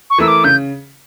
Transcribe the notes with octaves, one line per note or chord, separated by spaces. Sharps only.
C#6
E3 A3 E4 A#4 E6
D6
C#3 G6